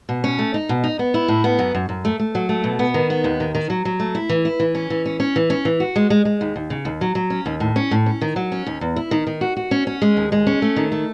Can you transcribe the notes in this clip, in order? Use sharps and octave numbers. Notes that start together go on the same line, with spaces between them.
B2
C#4
A3
D#4
B2
D#4
B3
E4
A2
B3
F#2
F#2
F#2
A3
A3
F#3
A3
B2
B3
D#3
B3
D#2
D#3
D#3
F#3
F#3
A3
E4
E3
E4
E3
C#4
E3
C#4
C#4
E3
C#4
E3
F#4
G#3
G#3
G#3
D#2
D#2
C#3
D#2
F#3
F#3
C#4
D#2
A2
C#4
A2
C#4
D#3
F#3
C#4
D#2
E2
E4
D#3
D#3
F#4
F#4
C#4
C#4
G#3
D#2
G#3
C#4
A3
D#3
A3